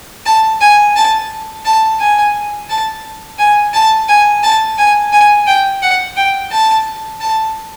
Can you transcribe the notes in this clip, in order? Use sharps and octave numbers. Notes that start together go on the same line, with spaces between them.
A5
G#5
A5
A5
G#5
A5
G#5
A5
G#5
A5
G#5
G#5
G5
F#5
G5
A5
A5